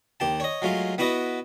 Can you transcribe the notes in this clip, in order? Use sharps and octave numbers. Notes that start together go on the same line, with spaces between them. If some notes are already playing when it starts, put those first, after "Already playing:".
D#2 G4 A5
C#5 D#5
F#3 G#3 A3 F4
B3 E4 F#4 B4 D#5